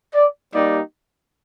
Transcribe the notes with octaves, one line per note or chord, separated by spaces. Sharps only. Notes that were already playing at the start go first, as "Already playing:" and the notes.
D5
G3 A#3 D#4 G4 D5